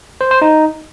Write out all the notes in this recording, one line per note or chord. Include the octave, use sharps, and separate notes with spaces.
C5
C5
D#4